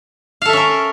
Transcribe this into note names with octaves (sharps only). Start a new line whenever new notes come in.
C#4 A4 A#4 E5 F5